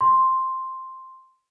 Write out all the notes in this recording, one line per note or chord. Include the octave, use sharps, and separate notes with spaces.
C6